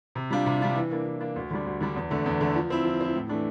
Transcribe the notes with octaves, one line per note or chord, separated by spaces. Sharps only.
C3
G3 D4 F4
C3
G3 D4 F4
E3
A#3 D4
E3
A#3 D4
D2
D3 G3 D4
D2
D3 G3 D4
E2
D3 A3
E2
D3 A3
F3
C4 E4
F3
C4 E4
A2
E3 A3 D4